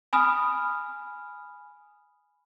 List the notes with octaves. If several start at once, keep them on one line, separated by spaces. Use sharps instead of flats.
G#5 B5 D#6 F6